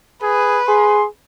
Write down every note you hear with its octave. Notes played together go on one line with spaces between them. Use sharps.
G#4 B4
G#4 C6